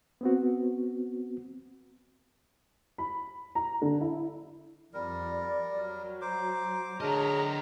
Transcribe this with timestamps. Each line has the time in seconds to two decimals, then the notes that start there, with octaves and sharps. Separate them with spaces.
0.21 B3 C4 F#4
2.98 B5
3.55 A#5
3.82 D3
4.01 E4
4.94 F2 G3 A#4 D5
5.76 F#3
6.22 C5 A#5 D6
7.01 D3 F#3 D4 G#4 A#4 D#5 A#5